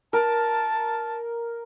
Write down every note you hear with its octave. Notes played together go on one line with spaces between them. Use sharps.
A#4 A5